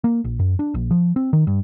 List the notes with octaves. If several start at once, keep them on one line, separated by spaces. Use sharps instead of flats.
A#3
A#1
F#2
D4
A#1
F3
C4
D#3
G2